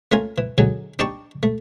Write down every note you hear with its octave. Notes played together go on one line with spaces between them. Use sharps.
A3 C#4 F4 A#4 G#5
E3
D3 F#3 D#4 G#4
D4 D#4 G4 D5 A5 C#6
A3